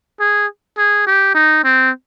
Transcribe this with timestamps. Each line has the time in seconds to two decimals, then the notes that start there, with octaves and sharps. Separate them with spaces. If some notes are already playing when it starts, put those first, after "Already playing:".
0.20 G#4
0.78 G#4
1.07 G4
1.35 D#4
1.64 C4